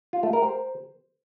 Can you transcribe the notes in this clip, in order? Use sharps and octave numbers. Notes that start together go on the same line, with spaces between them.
F4
A3
A#4
C5